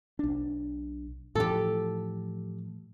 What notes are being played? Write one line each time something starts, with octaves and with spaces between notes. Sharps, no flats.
B1 D4
A2 E3 F3 G4 A4